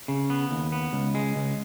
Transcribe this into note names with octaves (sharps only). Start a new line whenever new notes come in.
C#3
B3
D#2
B3
C#2
G#3
C#2